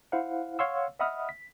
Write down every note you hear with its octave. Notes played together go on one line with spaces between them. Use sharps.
E4 C5 F5 F#5
C#5 F5 F#5 C6 C#6 E6
D#5 E5 F#5 B5 D#6 F6
B6